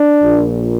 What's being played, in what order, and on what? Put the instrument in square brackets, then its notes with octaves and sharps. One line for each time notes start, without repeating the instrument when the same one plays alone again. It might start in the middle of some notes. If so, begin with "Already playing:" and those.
Already playing: [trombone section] D4
A#1 A#2